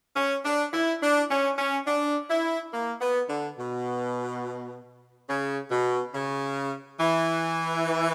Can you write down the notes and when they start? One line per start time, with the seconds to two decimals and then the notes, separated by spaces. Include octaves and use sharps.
0.16 C#4
0.45 D4
0.73 E4
1.02 D4
1.31 C#4
1.59 C#4
1.87 D4
2.30 E4
2.73 A#3
3.01 B3
3.29 D3
3.58 B2
5.29 C#3
5.71 B2
6.15 C#3
7.00 E3